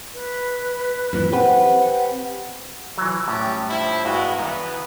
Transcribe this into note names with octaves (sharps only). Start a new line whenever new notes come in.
B4
F#2 A#2 E3
C4 G4 B4 F#5
E3 F#3
A2 G3 C#4
G2 F3 E4
G2 G#3 B3 F#4
E3 B3 A#5